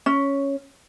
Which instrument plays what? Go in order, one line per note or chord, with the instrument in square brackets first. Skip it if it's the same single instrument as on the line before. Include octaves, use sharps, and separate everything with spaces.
[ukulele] C#4